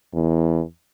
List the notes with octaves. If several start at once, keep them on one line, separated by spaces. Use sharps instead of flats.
E2